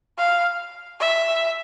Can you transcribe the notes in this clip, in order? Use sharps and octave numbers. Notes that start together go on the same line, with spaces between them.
F5
E5